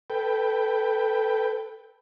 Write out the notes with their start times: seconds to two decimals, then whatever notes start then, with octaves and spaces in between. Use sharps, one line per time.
0.10 A4 B4 G5